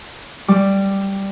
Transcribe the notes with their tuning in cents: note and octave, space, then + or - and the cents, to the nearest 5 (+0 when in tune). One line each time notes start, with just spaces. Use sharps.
G3 +0 D6 +0